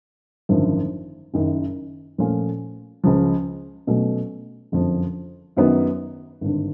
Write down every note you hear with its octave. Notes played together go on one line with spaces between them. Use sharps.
G#1 F#2 D3 F3
F#1 F#2 D#3
A#2 F3 A3 C#4 F4
C#2 C#3 F3
B2 F#3 A3 C#4
F#1 F2 D3 F3
F#2 D#3 F#3 B3
G#1 G2 D3